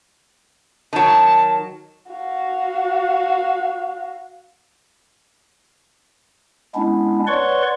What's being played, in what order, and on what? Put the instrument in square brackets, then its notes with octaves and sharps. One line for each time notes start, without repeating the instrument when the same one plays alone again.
[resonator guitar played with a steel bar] D#3 F#3 [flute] A5
[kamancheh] F#4 F5
[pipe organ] G#3 B3 C#4 D4 E4
B4 C#5 D5 F#5 C6 C#6